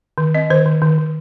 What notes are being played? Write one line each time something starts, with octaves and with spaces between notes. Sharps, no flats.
D#3
C4 D#5
D#3 C5
D#3
D#3
D#3